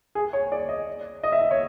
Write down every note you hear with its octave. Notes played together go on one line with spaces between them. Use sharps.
G#4
C#5
D5
D#5
D#5
E5
D#5
C#5